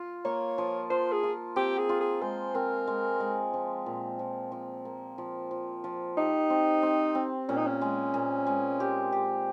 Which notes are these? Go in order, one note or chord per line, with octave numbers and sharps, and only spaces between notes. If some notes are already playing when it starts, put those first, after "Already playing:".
Already playing: F4
A#3 C#5
F3
F3 C5
G#4
F4
C4 G4
G#4
F4
G#4
G#3 C5
C4 A#4
G#3
G#3
F3
A#2
F3
F3
A#3
F3
F3
F3
D#4 G4
C4
C4
C4
A#2 C#4
D#4
C#4
G#3
A#2
G#3
G4
G4